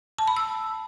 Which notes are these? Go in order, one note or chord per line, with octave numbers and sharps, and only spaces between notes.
A5
B5
E6